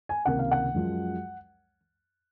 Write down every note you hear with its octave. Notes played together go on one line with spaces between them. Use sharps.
G#5
C#2 C3 D#3 A#3 F#5
F5
F#5
F#2 F3 G#3